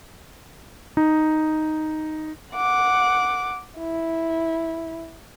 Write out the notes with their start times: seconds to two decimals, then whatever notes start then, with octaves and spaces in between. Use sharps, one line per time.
0.97 D#4
2.54 F#5 D6
3.79 E4